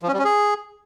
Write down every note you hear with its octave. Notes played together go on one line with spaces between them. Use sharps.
F3
C#4
G3
C#4
G#4